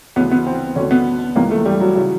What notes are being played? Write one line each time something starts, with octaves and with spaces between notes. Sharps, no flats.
D2 C#3 E3 B3
B3
C4
D2 D3 C#4
B3
C#2 C#3 E3 A#3
A3
G3
F#3
C#3 E3